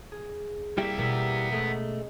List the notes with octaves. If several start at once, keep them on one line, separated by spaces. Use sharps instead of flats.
G#4
C2 G3 A#3 E4 G4 E5
B2 B3 A#4 E5 A#5
G#3 A3 C#4 D#5